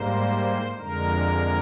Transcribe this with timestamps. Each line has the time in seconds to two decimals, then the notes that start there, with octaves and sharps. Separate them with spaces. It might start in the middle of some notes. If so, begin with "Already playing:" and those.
Already playing: G#2 G3 A#3 C5
0.78 F2 D3 G#3 A#4